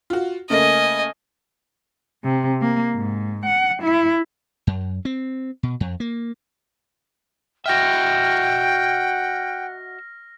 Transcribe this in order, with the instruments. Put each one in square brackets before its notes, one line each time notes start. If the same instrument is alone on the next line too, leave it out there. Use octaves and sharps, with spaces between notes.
[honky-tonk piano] F4 F#4
[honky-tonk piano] C#3 A3 A#3 [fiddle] D#5 G#5
[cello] C3
A#3
G#2
F#5
E4
[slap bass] F#2
C4
B2
F2
A#3
[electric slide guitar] F#4 D#5 E5 [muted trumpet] F#5 [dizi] G5 [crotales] F6 A#6